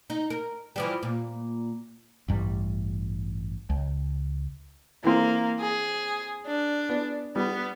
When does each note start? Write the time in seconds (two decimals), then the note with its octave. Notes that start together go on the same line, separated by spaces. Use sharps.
0.10 D#4
0.30 A#4
0.76 E3 F3 G3
1.03 A#2
2.28 A1 G2 G3
3.70 C#2
5.04 E3 A#3 C4
5.60 G#4
6.47 D4
6.89 B3
7.36 G3 B3